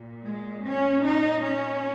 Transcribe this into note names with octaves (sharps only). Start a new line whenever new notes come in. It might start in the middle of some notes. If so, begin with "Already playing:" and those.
Already playing: A#2
G#3
C#4
D#4
C#4